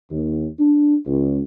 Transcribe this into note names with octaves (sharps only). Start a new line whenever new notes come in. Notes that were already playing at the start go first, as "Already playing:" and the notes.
D#2
D4
C#2